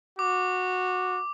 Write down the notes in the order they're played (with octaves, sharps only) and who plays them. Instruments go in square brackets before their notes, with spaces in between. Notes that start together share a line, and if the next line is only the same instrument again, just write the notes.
[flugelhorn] F#4 [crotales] D6